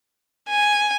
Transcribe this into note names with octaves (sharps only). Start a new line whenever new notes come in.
G#5